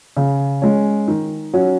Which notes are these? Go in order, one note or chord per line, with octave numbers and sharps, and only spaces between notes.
C#3
G#3 C#4
D#3
F#3 C#4 F#4